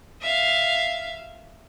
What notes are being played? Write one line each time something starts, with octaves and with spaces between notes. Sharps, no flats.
E5 F5